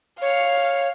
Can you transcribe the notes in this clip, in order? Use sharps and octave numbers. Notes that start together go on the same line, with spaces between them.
C#5 F5